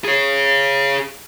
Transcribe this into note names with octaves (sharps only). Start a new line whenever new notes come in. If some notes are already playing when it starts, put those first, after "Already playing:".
G#4 C#5